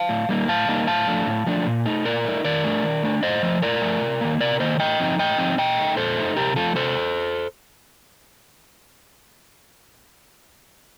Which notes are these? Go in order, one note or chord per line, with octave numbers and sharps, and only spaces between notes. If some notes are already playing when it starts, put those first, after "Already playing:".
Already playing: F5 A5
A2
G3 A#3 D#4
A2 F5 A5
G3 A#3 D#4
A2 F5 A5
F3 A3 D4
A2
F3 A3 D4
A#2
A3 D#4
A#2 A#4 D5
A3 D#4
D#3 A#4 D5
A3 D4
D#3
A3 D4
A2 C5 D#5
F3 A3
A2 A#4 D5
F3 A3
C3
D#3 A#3
C3 A#4 D5
D#3 A#3 C5 D#5
A2 D#5 G5
F3 C4 D#4
A2 D#5 G5
F3 C4 D#4
A#2 D#5 G5
A3 D#4
A#2 A4 C5
A3 D#4
C3 G4 A#4
F3 A3 F4 A4
C3 A4 C5